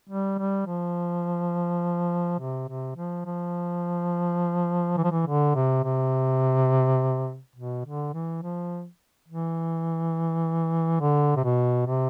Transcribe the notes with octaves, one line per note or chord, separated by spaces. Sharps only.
G3
G3
F3
C3
C3
F3
F3
E3
F3
E3
D3
C3
C3
B2
D3
E3
F3
E3
D3
C3
B2
C3